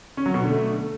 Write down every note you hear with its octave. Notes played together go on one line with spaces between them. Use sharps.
C#4
F#3
B2
D3
A3